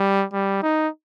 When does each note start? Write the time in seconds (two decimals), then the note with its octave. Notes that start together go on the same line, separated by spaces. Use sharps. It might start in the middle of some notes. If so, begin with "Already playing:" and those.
Already playing: G3
0.33 G3
0.63 D#4